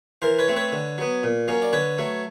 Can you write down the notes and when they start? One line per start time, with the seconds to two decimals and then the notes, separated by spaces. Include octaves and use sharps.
0.22 E3 A#4 C5
0.39 B4 C#5
0.48 A3 C4
0.56 B4 C#5
0.72 D3
0.98 F#3 B3
1.23 A#2
1.48 F#3 A#3 C#4
1.62 D5
1.73 D3 B4 C#5
1.98 F#3 A3